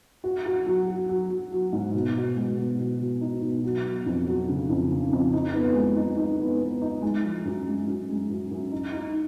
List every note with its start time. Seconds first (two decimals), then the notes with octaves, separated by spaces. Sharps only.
0.24 F#4
0.46 F#4
0.66 F#3
0.88 F#4
1.09 F#3
1.30 F#3
1.52 F#3
1.73 G#2
1.94 B2
2.15 B2
2.36 G#3
2.57 B2
2.78 B2
3.00 B2
3.21 D#4
3.42 B2
3.64 F#3
3.85 F#3
4.06 F2
4.27 F#3
4.48 C#3
4.69 F2
4.91 C#3
5.12 F2
5.33 D#4
5.54 B3
5.75 G#3
5.96 D#4
6.18 D#4
6.39 B3
6.60 B3
6.82 D#4
7.02 G#3
7.24 F3
7.45 F#2
7.67 G#3
7.87 F#2
8.09 G#3
8.30 F#2
8.51 F#2
8.72 D#4
8.93 D#4